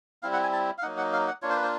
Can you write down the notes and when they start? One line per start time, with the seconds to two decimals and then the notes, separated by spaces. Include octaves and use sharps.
0.22 G3 C4 E4 F5
0.33 F#5
0.43 G#5
0.53 A5
0.78 F5
0.82 F#3 A#3 D#4 F#5
0.97 F#5
1.13 F5
1.27 F#5
1.42 A#3 D4 F4 C#5
1.50 C5
1.56 B4
1.63 C5